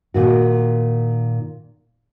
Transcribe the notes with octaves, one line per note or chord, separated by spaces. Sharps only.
A#2 D#3 F#4